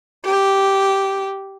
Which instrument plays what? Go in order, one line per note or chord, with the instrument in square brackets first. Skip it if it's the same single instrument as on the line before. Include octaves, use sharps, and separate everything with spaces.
[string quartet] G4